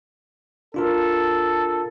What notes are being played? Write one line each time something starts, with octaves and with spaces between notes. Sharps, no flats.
D4 F4 A4 A#4